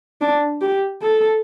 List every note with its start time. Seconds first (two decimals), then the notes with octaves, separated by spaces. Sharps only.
0.21 D4
0.61 G4
1.02 A4